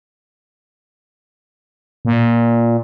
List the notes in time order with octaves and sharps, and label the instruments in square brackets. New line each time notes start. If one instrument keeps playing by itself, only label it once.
[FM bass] A#2